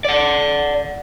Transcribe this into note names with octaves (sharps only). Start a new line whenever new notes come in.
D5 F#5